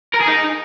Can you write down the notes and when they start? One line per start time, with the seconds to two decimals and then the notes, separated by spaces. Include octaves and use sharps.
0.14 A#4
0.21 G#4
0.28 D#4